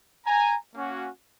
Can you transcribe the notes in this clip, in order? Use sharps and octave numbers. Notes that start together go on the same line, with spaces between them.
G#5 A#5
A#3 C#4 F#4